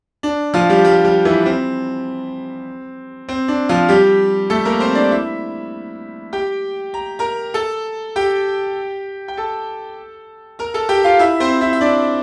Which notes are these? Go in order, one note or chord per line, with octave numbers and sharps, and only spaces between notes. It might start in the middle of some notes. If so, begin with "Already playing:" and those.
D4
F3 F4
G3 G4
G3 G4
G3 G4
E3 E4
C4
C4
D4
F3 F4
G3 G4
A3 A4
A#3 A#4
C4 C5
D4 D5
E4 E5
G4 G5
A#5
A#4 A#5
A4 A5
G4 G5
G5
A4 A5
A#4 A#5
A4 A5
G4 G5
F4 F5
E4 E5
C4 C5
E4 E5
E5
D4 D5